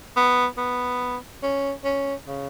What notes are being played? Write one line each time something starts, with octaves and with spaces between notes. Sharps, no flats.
B3
B3
C#4
C#4
C#3